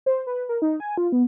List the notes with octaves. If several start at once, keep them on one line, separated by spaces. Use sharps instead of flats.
C5
B4
A#4
D#4
G#5
F4
B3